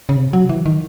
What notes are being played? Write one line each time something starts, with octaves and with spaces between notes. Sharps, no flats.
C#3
C3
F#3
E3
D#3